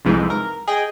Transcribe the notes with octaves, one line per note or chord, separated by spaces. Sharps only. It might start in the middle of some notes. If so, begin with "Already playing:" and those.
C2 F2 G#2 E3
A#4
G#4 D#5 G5